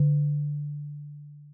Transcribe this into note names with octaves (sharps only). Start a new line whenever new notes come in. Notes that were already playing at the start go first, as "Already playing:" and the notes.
Already playing: D3